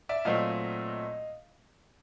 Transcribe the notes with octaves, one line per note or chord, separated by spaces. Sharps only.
D5 E5
A#2 F#3 A3 C4 D#5 F5